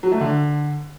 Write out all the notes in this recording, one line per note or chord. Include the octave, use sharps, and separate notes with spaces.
F#3
A3
D3